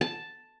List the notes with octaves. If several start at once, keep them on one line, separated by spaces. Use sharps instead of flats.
A5